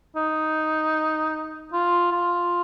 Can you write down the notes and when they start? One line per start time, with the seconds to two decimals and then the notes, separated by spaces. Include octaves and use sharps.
0.16 D#4
1.73 F4
2.12 F4